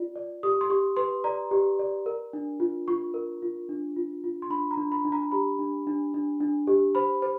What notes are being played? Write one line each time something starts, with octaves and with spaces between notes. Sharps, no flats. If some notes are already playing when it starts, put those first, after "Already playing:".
Already playing: F4 D5
D5
G4 D#6
C6
G4 C#6
B4 C6
D5 A#5
G4
D5
A#4
D4
F4
F4 C#6
A#4
F4
D4
F4
F4
C6
D4 B5
A#5
D4
B5
D4
A#5
G4 B5
D4
D4
D4
D4
G4
C5 B5
C5